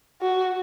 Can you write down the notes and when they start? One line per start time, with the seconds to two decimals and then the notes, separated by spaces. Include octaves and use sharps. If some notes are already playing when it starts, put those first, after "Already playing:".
0.22 F#4